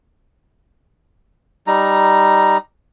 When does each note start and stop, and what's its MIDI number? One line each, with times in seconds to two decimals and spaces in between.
1.67 2.57 55
1.67 2.57 63
1.67 2.57 82